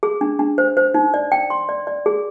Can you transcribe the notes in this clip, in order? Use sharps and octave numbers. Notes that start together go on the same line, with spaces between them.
G#4
D4
D4
C5
C5
D#4
D5
G5
C6
D5
D5
G#4